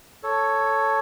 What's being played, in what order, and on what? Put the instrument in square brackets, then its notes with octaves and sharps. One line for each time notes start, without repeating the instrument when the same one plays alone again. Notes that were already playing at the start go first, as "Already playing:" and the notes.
[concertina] A4 C#5